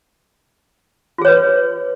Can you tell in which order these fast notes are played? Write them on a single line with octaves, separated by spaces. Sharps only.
F4 G#4 C#5 B4